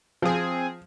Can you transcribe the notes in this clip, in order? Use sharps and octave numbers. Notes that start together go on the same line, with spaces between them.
F3 C4 G#4